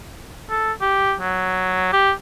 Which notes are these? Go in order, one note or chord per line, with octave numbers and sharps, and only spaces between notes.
A4
G4
F#3
G4